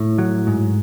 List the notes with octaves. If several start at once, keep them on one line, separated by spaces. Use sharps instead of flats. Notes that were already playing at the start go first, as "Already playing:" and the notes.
Already playing: A2
F#3
G#2